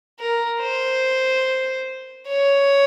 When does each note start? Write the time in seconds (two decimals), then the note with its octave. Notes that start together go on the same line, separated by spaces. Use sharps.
0.19 A#4
0.61 C5
2.27 C#5